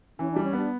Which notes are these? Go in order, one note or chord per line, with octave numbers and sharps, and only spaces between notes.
E3 C#4
G3 D4
C#4
B3 D4